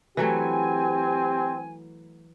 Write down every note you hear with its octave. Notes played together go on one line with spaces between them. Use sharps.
E3 F#3 A3 C4 G4 G#5